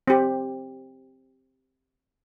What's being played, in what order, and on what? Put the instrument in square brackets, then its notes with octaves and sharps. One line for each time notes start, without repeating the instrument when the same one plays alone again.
[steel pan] C4 G4